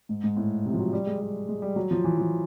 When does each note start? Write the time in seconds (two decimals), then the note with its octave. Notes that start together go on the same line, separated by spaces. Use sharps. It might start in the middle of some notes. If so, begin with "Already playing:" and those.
0.09 G#2
0.24 G#2
0.37 A2
0.65 C3
0.73 F3
0.79 F#3
0.93 G3
1.07 G#3
1.20 G3
1.49 G#3
1.62 G3
1.76 F#3
1.91 F3
2.04 E3
2.18 F3